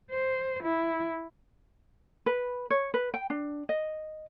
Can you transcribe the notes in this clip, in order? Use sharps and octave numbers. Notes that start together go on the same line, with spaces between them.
C5
E4
B4
C#5
B4
G5
D4
D#5